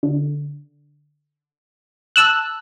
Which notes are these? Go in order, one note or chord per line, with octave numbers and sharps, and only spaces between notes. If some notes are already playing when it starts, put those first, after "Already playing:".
D3
A5 E6 F#6